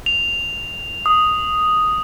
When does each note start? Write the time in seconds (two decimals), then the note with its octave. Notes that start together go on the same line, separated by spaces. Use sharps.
0.06 F7
1.06 D#6